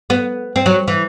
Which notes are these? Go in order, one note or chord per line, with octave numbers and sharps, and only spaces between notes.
B3
C4
F#3
E3